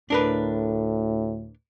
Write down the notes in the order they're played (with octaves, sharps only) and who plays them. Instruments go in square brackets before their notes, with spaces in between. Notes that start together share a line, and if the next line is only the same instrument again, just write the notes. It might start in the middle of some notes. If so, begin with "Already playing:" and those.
[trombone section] D2 A2 [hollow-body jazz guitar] D4 A#4 B4